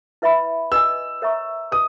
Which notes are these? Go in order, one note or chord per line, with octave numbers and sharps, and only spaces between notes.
E4 B4 E5 B5
B4 D#5 G#5 E6
A#4 C#5 E5 A#5 C#6
B4 D#5 D#6